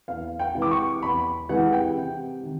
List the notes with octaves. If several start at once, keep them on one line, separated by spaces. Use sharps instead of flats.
E2 F5
G5
C3 E3 G#3
D6
C#6
E2 B5
C3 E3 G#3 F#5
G5
C3
D#3